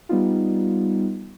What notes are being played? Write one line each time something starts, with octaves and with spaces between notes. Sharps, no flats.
G3 B3 D#4 F4